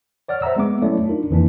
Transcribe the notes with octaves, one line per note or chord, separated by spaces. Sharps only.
C#5 D5 F#5 F6
C5 E5 F#5 A#5 E6
G#3 B3 D6
F#3 A3 C#4 E4 C#5 D5
D4 D#4 F4 A#4
F2 D#3 E3 A#3 D4 D#4